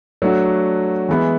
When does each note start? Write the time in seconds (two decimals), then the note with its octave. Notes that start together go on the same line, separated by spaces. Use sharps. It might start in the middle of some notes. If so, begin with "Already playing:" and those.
0.22 F#3 A3 D4 F#4
1.09 E3 G#3 B3 E4